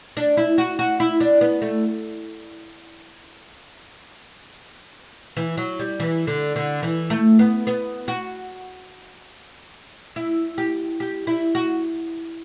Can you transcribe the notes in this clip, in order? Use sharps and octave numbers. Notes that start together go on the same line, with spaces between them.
D4
E4
F#4
F#4
E4
D4
B3
A3
E3
F#3
G3
E3
D3
D3
E3
A3
B3
B3
F#4
E4
G4
G4
E4
F#4